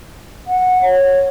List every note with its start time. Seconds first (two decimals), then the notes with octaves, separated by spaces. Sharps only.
0.47 F#5
0.82 C#5